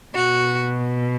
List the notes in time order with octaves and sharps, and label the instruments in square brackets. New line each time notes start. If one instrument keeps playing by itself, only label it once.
[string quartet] B2 F#4